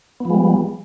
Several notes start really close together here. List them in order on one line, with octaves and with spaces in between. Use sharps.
B3 F3 G#3 G3